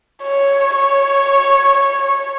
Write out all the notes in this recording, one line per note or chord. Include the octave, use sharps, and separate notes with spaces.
C#5
C#5
C#5